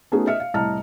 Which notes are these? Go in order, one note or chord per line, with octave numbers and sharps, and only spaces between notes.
A3 B3 C#4 D#4 F#4 G#4
D#5 E5 F6 C#7
F5
C2 A2 D#5 A5 A#5 F6